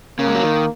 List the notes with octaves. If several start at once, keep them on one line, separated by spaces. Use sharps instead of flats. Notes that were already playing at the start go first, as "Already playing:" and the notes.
C#3 A#3
G#3
F#3
D#3